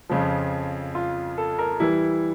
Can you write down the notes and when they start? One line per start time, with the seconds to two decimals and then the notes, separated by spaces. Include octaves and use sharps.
0.10 F2 C#3 F3
0.95 F4
1.38 A4
1.59 A#4
1.80 E3 G3 E4